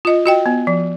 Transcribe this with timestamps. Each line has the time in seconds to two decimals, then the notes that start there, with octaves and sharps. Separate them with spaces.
0.05 F4 D#5
0.26 F#4 D#5 G5
0.46 B3
0.67 F3